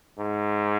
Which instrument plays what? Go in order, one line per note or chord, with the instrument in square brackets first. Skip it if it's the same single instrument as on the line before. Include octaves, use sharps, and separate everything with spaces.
[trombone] G#2